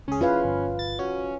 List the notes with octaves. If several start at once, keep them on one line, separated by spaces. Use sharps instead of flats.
C#2 C#4 G#4
E4 F4 G#4 B4 F5 G#5
G1
A6
C#4 F#4